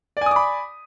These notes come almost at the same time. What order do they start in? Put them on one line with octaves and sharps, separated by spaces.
D5 G#5 D#6 D6 B5